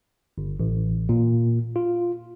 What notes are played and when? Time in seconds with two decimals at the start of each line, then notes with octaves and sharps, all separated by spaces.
0.38 G1
0.59 A1
1.09 A#2
1.76 F4